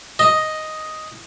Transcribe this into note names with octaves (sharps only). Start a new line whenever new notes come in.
D#5